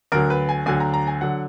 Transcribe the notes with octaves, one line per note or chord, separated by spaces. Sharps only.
D2 D3 F#3 A#4
B4
G#5
D2 D3 F#3 G#5
A#5
A#5
G#5
D3 F#3 F#5